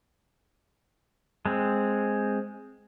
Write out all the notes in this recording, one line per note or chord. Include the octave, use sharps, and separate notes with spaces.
G#3 C4